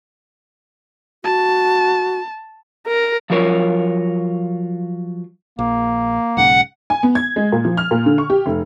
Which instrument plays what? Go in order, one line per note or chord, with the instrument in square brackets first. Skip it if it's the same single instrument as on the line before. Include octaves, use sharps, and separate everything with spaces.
[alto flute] F#4 [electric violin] A5
[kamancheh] A#4
[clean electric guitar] F3 F#3 F4 A#4 C#5
[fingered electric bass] A#1 [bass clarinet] A#3
[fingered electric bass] B1 G#2 C#3 [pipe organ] F#5
[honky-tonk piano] G#5
B3
G#6
G#3
A#2
F3
F6
A#2
D3
C#6
G4
F1